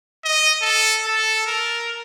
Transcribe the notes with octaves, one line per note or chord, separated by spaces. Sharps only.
D#5
A4
A4
A#4